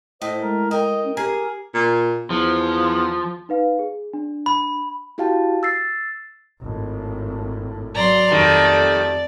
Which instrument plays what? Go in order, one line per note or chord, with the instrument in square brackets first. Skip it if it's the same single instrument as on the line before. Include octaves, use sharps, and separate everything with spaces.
[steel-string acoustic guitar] A2 [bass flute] C5 [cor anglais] D#5
[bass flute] G#3 [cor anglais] A#4
[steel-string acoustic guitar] A#4 G5 [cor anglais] D#5
[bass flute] C#4
[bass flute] G4 [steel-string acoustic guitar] G#4 [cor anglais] A#4
[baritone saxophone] A#2
[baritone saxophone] E2 [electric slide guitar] F3
[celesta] D#4 B4 F5
G#4
D4
[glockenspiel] B5
[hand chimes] E4 F#4 G4 F5 G5 A5
E6 A6 C7
[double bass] G#1 A2
[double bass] F#3 [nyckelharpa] D5 [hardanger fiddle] A#5 C6
[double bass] F2 [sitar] D#3 G3 [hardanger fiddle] A3